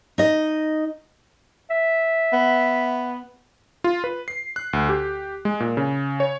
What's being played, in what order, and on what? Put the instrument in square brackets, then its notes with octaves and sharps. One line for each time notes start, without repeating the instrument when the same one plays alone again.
[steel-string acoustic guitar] D#4 D#5
[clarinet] E5
[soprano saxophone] B3
[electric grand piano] F4
B4
C7
F#6
D2
G4
G#3
A#2
C#3
C#5